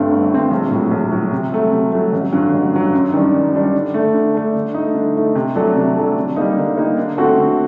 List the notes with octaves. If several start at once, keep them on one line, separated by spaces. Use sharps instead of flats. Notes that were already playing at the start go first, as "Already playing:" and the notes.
Already playing: G1 G2 D3 A3 C4
G1
G2 D3 A3 C4
A#1
A2 F#3
A#1
A2 F#3
C3
F#3 A3
C3
F#3 A3
A1
G2 D3 F#3
A1
G2 D3 F#3
F#2
D#3 G3 D4
F#2
D#3 G3 D4
D3
A3 D4
D3
A3 D4
D3
A3 D#4
D3
A3 D#4
C3
F#3 A3 D4 A4
C3
F#3 A3 D4 A4
D3
G3 A#3 D#4
D3
G3 A#3 D#4
D3
A3 C4 F#4 A4
D3